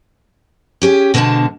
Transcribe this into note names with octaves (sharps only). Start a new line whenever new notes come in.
C#4 G4 G#4
B2 D3 F3 G#3 D4 A5